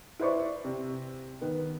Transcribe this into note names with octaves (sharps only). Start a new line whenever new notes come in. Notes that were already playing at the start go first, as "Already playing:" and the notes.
E4 B4 C5 D5 C#6
C3
D#3 B3